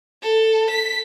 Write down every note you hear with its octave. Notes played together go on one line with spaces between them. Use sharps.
A4
B6